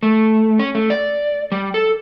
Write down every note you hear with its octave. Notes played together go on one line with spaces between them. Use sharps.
A3
C#4
A3
D5
G3
A4